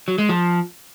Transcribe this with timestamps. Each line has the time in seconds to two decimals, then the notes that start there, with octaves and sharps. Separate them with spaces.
0.08 F#3
0.18 G#3
0.29 F3